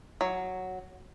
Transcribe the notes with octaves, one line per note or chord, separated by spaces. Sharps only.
F#3